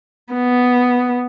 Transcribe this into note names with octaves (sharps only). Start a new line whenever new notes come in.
B3